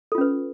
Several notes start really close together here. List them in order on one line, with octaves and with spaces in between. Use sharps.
A4 F4 C#4 B4